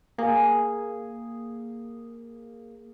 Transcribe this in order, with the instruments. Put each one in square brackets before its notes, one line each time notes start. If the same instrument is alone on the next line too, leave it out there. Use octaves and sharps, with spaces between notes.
[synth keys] A#3 [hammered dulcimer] G#4